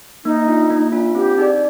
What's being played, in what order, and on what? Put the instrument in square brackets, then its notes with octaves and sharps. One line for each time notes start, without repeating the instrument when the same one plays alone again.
[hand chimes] A#3 [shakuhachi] D#4
[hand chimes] D4 F4
A#3
D4 F4
[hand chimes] C4 [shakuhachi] G4
[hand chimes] D#4 G#4 D5